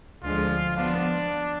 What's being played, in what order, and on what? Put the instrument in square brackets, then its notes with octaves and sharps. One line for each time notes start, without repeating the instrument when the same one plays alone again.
[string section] D2 D3 F3 G#3 [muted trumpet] F4
[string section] F3 B3 F4 [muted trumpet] D4